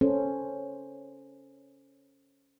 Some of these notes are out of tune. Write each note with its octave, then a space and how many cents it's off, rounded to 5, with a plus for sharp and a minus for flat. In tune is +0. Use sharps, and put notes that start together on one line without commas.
C#4 +0 A4 +0 C5 +0